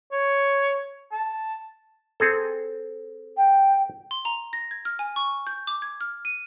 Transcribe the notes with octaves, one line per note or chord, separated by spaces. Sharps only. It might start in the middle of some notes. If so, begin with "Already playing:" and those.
C#5
A5
C4 G#4 A4
G5
C6
A#5
A#6
G#6
F6
G#5
C#6
G6
D6
G#6
F6
D#7